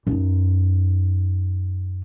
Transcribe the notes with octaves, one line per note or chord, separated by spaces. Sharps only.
F#2 D#4